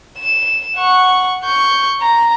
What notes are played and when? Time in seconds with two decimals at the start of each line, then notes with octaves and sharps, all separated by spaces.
0.18 E7
0.76 F#5 C#6
1.45 C#6 G6
2.01 A#5